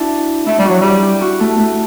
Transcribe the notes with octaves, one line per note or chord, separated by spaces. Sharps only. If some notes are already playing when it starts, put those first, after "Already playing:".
Already playing: D4 E4 F#4
A3 E4
G3
F#3 F#4
G3 G4
G4
F#4
A3
A3